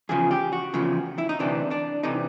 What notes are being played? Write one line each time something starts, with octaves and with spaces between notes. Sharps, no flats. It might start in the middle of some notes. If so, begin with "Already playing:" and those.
E2 C#3 F3 G#4
G4
F#4
E2 C#3 F3
E4
D#4
D2 C3 E3 D4
D4
C3 E3 D#4